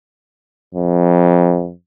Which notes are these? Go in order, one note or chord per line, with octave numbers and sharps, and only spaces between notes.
F2